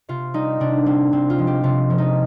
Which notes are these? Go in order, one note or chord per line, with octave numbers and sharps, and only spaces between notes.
C3 F4
G3 D#4
C3 D4
G3 C4
C3 C4
F4
F3 G#3
G4
C3 F4
F3 G#3
D#4